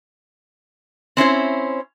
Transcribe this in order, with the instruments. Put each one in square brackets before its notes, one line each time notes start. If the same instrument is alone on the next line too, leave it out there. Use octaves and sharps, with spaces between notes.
[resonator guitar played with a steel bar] C4 C#4 E4 C5